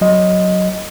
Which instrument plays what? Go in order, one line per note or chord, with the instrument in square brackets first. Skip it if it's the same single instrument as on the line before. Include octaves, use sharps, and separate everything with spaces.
[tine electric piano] F#3 D#5